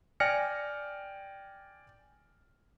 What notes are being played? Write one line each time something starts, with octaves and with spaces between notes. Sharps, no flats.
D5 G5 G#5 F6 A#6 C#7